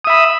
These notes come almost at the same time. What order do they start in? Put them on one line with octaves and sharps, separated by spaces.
D#6 E5 B5